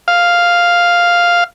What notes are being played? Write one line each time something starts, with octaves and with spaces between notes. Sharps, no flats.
F5